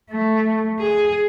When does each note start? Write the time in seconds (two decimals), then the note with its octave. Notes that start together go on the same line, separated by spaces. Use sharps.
0.12 A3
0.80 G#4